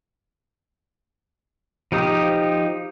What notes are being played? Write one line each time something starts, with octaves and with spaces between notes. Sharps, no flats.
F3 D#4 G4 D#6